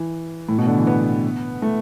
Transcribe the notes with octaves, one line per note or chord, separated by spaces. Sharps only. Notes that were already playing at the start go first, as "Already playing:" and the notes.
Already playing: E3
A2
B2
D3
E3
B3
A3